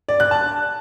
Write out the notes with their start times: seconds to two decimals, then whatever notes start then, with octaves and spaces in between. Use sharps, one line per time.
0.08 D5
0.20 F#6
0.31 A5